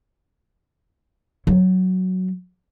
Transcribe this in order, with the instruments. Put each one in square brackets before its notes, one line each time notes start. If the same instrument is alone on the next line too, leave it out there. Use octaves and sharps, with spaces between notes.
[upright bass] F#3